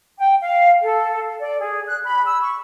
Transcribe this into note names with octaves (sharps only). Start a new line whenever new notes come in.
G5
F5
A4
D5
G#4
F#6
B5
E6
C#6